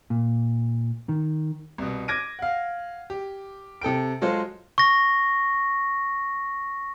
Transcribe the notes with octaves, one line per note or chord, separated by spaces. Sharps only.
A#2
D#3
C2 B2
D6 G#6 A#6 D7 D#7
F5 F#5
G4
C3 A4 G5 D7
F#3 G#3 F4 A4 C5
C#6 A#6